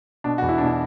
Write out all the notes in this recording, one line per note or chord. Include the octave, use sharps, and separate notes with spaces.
B2 D4
E2 F#4
E4
D4
B2
E4